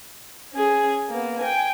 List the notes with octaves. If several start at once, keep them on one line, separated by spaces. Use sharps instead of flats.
C#4 G#4
A#3 B3
G5 G#5